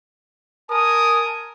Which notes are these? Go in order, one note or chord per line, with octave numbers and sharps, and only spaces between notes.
A#4 G#5 A5 D#6